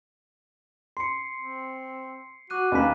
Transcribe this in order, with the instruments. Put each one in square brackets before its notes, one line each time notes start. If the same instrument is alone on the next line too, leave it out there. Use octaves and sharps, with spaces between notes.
[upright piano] C6 [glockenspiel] C7 C#7
[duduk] C4
[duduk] F#4 [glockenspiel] D6 F#6 D#7
[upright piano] D#2 A#3 [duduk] B4 [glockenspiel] G#5 A5 B6